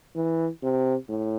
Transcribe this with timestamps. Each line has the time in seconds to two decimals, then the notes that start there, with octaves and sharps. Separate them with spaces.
0.15 E3
0.62 C3
1.09 A2